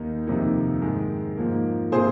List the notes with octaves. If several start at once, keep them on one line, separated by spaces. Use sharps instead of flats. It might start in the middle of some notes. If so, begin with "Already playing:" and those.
Already playing: D#2 D#3 A#3 D#4
F2 C3 D#3 A#3 D#4
G#2 D#3 G#3
G#2 F3 A#3
C3 F3 A#3 G#4 C5